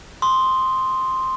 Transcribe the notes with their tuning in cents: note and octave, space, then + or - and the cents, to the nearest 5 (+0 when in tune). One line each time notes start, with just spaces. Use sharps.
C6 +0 D#6 +0